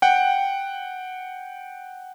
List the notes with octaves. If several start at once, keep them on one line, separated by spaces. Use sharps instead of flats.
F#5 G5